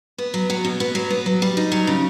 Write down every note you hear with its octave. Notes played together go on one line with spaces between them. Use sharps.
B3
F#3
F#3
B2
B3
F#3
B3
F#3
G3
D#4
F#3
C#3